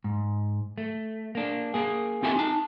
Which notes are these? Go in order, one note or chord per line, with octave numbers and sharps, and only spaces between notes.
G#2
A3
A#3 D4
A#3 G#4
C4 F4 G4 A4 E5 G#5
D#4 A5